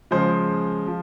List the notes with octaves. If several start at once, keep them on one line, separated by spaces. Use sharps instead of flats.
C#3 F3 G#3 C5
F3